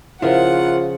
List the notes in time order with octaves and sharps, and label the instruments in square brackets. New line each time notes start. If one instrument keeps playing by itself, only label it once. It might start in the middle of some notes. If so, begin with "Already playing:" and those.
[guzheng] C#3 F3 [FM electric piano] E4 A#4 C5 [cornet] F4 [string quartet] F#5